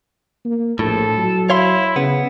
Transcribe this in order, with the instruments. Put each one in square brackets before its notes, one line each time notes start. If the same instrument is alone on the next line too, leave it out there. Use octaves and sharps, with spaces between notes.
[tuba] A#3
[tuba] A#1 [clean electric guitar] A2 [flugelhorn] A4
[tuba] F#3
[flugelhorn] E4 [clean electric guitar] C#5 F5 C6
[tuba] C#3 [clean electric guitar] B3